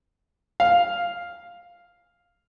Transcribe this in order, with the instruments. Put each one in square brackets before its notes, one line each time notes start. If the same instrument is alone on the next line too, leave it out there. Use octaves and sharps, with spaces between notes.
[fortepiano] F5